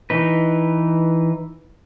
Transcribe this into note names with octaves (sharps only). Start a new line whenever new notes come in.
E3 D#4 B4